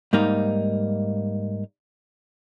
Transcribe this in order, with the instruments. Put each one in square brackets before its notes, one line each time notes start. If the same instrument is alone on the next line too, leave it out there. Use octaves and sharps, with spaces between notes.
[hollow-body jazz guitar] G#2 G3 A#3 D#4